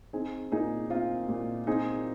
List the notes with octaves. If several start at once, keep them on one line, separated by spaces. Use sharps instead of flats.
C4 D#4 G#4
A#2 D#4 G#4
C4 F4
A#2
C4 D#4 G#4